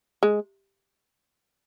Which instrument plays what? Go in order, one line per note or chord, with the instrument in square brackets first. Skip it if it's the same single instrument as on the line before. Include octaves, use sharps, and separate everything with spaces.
[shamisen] G#3